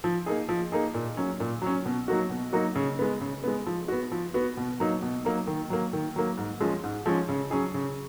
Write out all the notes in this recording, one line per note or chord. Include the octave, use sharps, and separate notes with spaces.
F3
A#3 D#4 G#4
F3
A#3 D#4 G#4
A#2
F#3 C#4
A#2
F#3 C#4
B2
F#3 A#3 D#4 F#4
B2
F#3 A#3 D#4 F#4
C#3
G#3 B3
C#3
G#3 B3
F3
B3 F#4
F3
B3 F#4
B2
F#3 A#3 D#4
B2
F#3 A#3 D#4
D#3
F#3 A#3
D#3
F#3 A#3
G#2
F3 G#3 C#4
G#2
F3 G#3 C#4
C#3
F#3 C#4 G#4
C#3